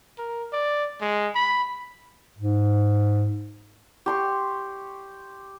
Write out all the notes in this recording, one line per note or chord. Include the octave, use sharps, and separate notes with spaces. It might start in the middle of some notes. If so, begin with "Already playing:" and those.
A#4
D5
G#3
B5
G#2
G4 C6 C#6